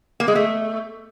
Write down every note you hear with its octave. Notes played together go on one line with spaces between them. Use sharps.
A#3
G#3
A3